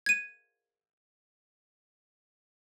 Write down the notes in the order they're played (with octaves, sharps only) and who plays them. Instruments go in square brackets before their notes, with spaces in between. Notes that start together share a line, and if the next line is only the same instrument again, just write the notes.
[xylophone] G#6 D#7